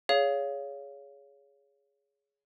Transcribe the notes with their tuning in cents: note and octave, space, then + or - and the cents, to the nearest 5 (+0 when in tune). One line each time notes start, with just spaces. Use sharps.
G#4 +0 C#5 +20 F5 -5